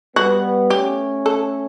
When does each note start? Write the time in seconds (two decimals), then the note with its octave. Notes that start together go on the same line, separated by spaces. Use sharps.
0.16 G3 B3 F#4
0.70 A3 C#4 G4
1.26 A4